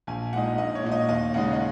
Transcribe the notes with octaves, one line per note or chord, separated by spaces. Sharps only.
A#1 G#5
A#2 G#3 D#4 F#5
A#1 D#5
C#5
A#2 G#3 D#4
D#5
D#2 D#5
C#3 G#3 D#4 F#5
D#5